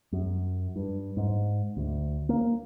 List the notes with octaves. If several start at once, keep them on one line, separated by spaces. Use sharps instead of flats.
F#2
G2
G#2
D2
A#3